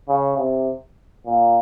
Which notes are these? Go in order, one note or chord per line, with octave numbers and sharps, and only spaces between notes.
C#3
C3
A#2